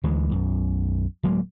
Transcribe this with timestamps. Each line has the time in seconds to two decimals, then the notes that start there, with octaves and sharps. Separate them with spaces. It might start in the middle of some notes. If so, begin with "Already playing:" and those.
0.04 D2 E3 G#3
0.31 B1 F#2
1.23 D1 F#3 G#3 A#3